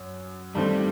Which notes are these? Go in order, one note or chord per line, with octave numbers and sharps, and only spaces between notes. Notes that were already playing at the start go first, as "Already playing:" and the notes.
Already playing: F#2
G2 D#3 G3 A3 C4